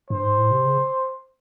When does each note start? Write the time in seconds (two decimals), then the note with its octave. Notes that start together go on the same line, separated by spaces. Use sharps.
0.10 G2 C5
0.24 G#2
0.38 A2
0.51 C3
0.65 C#3